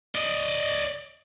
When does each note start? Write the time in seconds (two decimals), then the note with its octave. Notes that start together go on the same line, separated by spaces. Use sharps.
0.15 D5 D#5